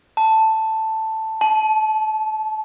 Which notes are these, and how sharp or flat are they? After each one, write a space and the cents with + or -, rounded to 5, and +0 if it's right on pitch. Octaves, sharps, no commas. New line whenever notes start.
A5 +5
A5 -25